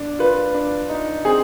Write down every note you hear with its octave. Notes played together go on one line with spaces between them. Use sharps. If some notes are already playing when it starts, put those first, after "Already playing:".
Already playing: D4
F4 B4
D4
D#4
C4 G#4